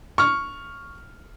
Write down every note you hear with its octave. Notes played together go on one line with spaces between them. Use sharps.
C#6 F6